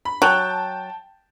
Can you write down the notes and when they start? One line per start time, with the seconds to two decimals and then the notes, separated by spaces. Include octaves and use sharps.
0.05 B5
0.22 F#3 G5 A5